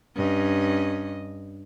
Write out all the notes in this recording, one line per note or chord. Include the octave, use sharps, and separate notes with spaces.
G2 C#4 D#5